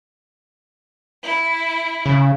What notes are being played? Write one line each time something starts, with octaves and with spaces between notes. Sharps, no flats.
E4
C#3